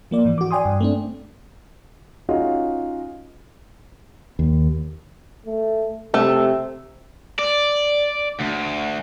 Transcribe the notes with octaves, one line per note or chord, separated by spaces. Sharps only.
F3 A#3 D5
G#2 E3
F#4 D6
D5 G5 G#5 C6 D#6
G2
A3 C4 D4
C#4 D#4 F4 F#4 G#4 D#5
D#2
A3
C3 A3
D5
D2